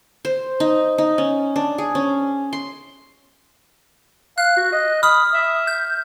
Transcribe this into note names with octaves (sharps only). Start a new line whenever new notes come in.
C5
D#4
D#4
C#4
D4
G#4
C#4
C6
F5 F#6
F#4
D#5
B5 D#6 F6
E5
G6